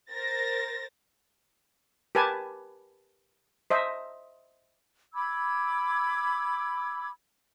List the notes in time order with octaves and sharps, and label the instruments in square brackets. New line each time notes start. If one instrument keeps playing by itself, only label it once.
[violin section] A#4 C5 A6 A#6
[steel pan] G4 A#4 B4 G#5 A5
C5 D#5 E5
[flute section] B5 D6 E6 G#6